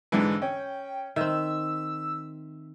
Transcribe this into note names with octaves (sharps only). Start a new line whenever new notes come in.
G#2 D3 E3 G#3
C#4 G5
D#3 C4 E5 E6